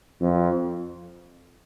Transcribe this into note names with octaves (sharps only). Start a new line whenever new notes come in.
F2